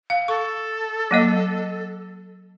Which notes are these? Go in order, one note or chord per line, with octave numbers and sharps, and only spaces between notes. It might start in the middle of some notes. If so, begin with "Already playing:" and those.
F5
A4 C#6
F#3 A#3 D#5